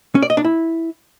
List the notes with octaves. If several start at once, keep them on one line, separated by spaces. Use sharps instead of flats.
C#4
D5
D#5
D4
E4